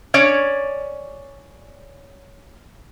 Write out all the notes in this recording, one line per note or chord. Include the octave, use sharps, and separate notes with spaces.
C#4 C#5 D5